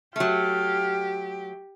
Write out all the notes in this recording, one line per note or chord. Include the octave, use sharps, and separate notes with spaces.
F#3 A3 G4 F5